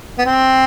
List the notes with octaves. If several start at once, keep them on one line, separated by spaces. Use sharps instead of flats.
B3
C4